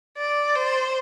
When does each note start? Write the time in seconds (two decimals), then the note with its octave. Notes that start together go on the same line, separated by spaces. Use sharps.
0.18 D5
0.56 C5